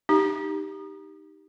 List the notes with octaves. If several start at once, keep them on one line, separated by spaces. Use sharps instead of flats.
D#4 G4